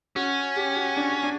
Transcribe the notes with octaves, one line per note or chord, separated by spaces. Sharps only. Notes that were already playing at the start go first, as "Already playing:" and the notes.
C#4 F#4
G4
F#4
D4
D4